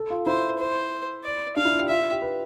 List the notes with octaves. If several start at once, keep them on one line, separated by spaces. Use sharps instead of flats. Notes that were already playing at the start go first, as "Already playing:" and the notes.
Already playing: A4
F4
E4 C5
C5
D5
D4 F5
E4
F4
G4
F4 E5
F4
G4
B4